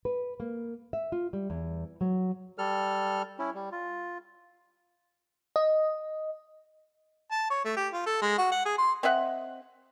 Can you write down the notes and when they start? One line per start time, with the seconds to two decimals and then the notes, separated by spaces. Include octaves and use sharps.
0.05 B4
0.40 A#3
0.93 E5
1.12 F4
1.33 G3
1.50 E2
2.01 F#3
2.58 G3 A4 F6
3.39 C#4 E4
3.54 G3
3.72 F4
5.56 D#5
7.31 A5
7.50 C#5
7.65 A3
7.77 G4
7.93 F4
8.06 A4
8.22 G#3
8.38 F#4
8.52 F#5
8.65 G#4
8.78 C6
9.03 C4 D#5 E5 F#5